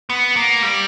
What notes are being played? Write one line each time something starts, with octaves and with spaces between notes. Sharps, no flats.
B3
A#3
G3